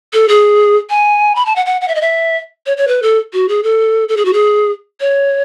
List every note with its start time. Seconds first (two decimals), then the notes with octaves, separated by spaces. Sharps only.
0.13 A4
0.28 G#4
0.90 G#5
1.36 B5
1.46 A5
1.56 F#5
1.66 F#5
1.81 F#5
1.88 E5
1.95 D#5
2.01 E5
2.66 C#5
2.77 C#5
2.88 B4
3.02 A4
3.33 F#4
3.49 G#4
3.63 A4
4.09 A4
4.17 G#4
4.25 F#4
4.33 G#4
5.00 C#5